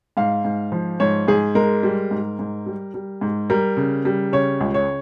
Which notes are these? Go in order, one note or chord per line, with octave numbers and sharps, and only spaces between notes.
G#2 F5
G#2
F3
G#2 C#5
G#2 G#4
G#3 A#4
G3
G#2
G#2
G3
G3
G#2
G3 A#4
C#3
G3
C#3 C#5
C#2
C#5